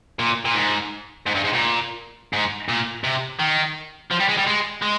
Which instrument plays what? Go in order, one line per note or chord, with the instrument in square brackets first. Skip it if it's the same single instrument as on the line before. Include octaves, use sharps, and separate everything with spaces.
[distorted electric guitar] A#2
A#2
G#2
G#2
G2
G#2
A#2
G#2
A#2
C3
D#3
F3
G3
G#3
G3
G#3
G#3